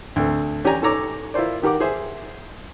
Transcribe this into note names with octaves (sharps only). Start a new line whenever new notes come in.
D2 C4 A4
C#4 G4 D5 G#5 A#5
G#2 A4 C#5 A#5 D6
E4 F4 A#4 C5 D5
D#3 G4 A#4 F#5 D6
G#4 C5 E5